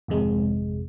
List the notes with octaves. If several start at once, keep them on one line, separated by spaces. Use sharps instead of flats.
G#1 F2 C3 G#3